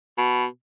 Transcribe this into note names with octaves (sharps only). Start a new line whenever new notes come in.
B2